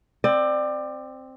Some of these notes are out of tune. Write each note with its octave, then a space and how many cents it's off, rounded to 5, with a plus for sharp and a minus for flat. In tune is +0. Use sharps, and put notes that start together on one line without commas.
C4 +0 D5 +25